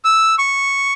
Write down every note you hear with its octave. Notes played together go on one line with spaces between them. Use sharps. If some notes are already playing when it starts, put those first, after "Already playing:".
E6
C#6